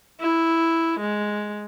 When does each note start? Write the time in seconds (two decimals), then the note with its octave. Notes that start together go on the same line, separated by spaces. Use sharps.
0.21 E4
1.00 G#3